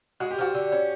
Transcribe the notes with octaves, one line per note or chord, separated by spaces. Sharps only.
G#3 F#4
G4
F3 F#4
D3
C#4